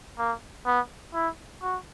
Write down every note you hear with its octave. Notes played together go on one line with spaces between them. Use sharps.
A#3
B3
E4
F#4